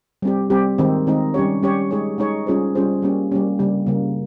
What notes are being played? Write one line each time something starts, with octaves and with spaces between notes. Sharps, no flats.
G3 C4 G4
G3 C4 G4
D#3 G#3 C4 D#4
D#3 G#3 C4 D#4
G3 C#4 G4 C#5
G3 C#4 G4 C#5
G#3 D#4 G#4 C#5
G#3 D#4 G#4 C#5
G3 C#4 F4 G#4 C5
G3 C#4 F4 G#4 C5
G3 A#3 C#4 G4
G3 A#3 C#4 G4
C#3 G3 A#3
C#3 G3 A#3